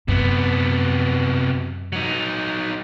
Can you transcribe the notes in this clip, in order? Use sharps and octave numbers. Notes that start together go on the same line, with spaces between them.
F#2 C3 B3
F#3 D#4